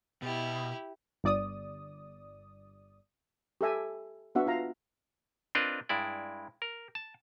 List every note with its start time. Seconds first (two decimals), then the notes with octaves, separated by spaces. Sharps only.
0.22 B2 E4 G4
1.24 G1 D5 D#6
3.61 G4 A4 E5 G#5
4.35 B3 D4 F#4 E5 F#5
4.47 F4 F5 A#5
5.55 C4 D4 F4 A#4 B4 D#5
5.89 G2 G#3 E4 D5
6.62 A#4
6.95 A5